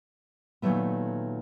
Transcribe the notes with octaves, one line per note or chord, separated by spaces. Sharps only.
A#2 D#3 F#3 A3 B3